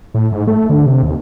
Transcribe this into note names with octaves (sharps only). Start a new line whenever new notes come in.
A2
G#2
A3
D3
C3
D#2